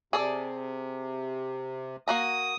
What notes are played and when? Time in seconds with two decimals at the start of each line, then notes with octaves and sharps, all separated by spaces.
0.13 C3 G#4 A4 D5
2.08 A#3 F#4 A#5 D#6